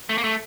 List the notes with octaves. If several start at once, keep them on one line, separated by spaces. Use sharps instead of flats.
A3
A#3
A3